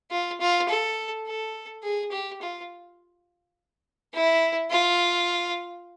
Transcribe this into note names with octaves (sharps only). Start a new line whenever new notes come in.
F4
F4
A4
A4
G#4
G4
F4
E4
F4